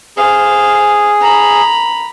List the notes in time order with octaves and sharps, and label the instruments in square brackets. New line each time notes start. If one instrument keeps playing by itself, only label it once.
[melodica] G#4 [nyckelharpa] C5 F5
[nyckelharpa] A#5 B5